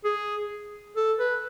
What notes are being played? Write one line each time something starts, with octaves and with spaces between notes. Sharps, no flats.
G#4
A4
B4